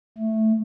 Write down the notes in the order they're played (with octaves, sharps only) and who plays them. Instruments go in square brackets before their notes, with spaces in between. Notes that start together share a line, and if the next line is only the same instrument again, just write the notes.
[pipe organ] A3